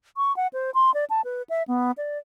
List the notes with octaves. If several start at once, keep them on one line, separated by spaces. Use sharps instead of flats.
C#6
F#5
C5
C6
D5
A5
B4
E5
B3
D5